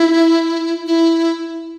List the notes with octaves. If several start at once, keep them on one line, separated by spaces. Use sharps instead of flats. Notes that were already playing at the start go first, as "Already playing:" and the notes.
Already playing: E4
E4